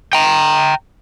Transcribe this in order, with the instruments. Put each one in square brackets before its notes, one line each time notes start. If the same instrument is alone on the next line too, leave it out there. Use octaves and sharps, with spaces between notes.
[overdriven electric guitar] G5 A#5